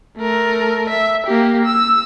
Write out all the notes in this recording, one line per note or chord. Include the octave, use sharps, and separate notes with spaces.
A3 A#4
E5
A#3 G4
E6